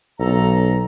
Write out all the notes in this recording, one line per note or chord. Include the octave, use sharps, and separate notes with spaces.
B1 A4 A#5